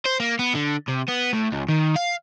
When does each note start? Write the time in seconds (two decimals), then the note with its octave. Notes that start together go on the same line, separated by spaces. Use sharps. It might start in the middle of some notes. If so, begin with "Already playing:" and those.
0.05 C5
0.20 A#3
0.39 B3
0.55 D3
0.88 C3
1.09 B3
1.33 A2
1.52 C#2
1.69 D#3
1.96 F5